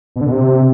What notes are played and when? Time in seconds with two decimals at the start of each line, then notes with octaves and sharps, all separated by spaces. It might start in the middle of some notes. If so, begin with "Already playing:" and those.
0.16 B2
0.21 D3
0.26 B2
0.32 C3